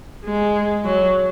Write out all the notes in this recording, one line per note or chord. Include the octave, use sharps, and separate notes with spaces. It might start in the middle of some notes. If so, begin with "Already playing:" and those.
G#3
F#3